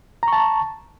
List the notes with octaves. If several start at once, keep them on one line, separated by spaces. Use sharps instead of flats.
A5 A#5 C#6